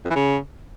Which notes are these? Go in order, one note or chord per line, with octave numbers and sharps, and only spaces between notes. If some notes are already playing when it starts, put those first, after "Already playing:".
F2
E3
C#3